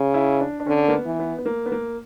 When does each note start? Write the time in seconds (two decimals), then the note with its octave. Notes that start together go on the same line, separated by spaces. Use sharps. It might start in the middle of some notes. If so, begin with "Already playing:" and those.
Already playing: C#3
0.14 E4
0.40 D4
0.60 D4
0.66 D3 C#4
0.88 A#3
0.93 B3
1.06 E3
1.19 B3
1.39 B3
1.46 A#3
1.66 B3
1.72 A#3